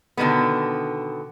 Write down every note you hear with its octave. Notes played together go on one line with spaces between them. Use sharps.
B2 D3 D#3 G#3 A#3 B3